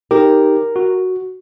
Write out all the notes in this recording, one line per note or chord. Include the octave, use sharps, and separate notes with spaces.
D#4 G4 A#4
F#4